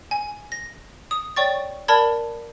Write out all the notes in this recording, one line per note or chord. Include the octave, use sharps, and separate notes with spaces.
G#5
A#6
D#6
C#5 D5 G5 C#6 A6
A#4 D5 A5 B5 G#6